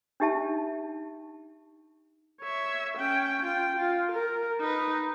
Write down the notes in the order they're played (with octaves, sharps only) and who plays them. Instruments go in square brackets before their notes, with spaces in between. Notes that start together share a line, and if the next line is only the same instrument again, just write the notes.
[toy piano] D4 D#4 G4 E5 A5
[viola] C#5 E5
C#4 G5
F4 G5
F4
A#4
D#4 B4